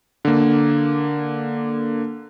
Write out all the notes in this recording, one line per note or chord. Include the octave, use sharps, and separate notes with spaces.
D3 A#3